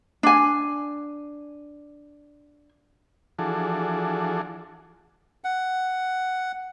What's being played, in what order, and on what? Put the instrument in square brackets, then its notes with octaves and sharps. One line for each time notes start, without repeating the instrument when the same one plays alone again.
[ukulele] D4 G#5
[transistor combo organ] E3 F3 D4 F#4 G#4 A4
[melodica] F#5